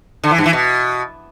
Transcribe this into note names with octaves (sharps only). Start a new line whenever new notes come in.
D3
E3
G2
E3
B2